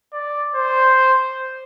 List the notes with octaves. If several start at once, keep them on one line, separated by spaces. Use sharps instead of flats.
D5
C5